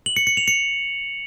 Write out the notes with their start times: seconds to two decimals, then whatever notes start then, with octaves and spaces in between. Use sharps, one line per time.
0.06 F#7
0.16 C#7
0.27 C#7
0.37 F7
0.48 C#7